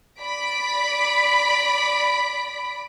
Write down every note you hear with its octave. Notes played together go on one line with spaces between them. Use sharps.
D5 B5 B6 D7